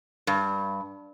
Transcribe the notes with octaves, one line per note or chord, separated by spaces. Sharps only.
G2